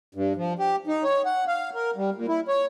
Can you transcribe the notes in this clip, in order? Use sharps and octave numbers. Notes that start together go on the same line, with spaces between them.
G2
F3
G4
D#4
C#5
F#5
F5
A#4
G3
A#2
E4
C#5